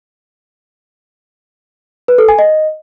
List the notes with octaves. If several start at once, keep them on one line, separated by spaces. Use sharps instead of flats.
B4
A4
G#5
D#5